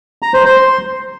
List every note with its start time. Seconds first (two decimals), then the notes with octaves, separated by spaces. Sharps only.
0.22 A#5
0.34 C5
0.45 C5
0.56 C6